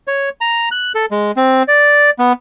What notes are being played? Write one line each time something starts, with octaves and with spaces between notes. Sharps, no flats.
C#5
A#5
F#6
A4
G#3
C4
D5
B3